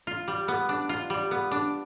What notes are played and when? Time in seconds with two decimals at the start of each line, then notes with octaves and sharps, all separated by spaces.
0.07 F4
0.28 G3
0.48 B3
0.69 D4
0.89 F4
1.10 G3
1.31 B3
1.51 D4